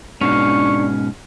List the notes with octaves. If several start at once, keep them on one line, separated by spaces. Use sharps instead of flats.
G#2 B2 C#4 D4 F5 C#6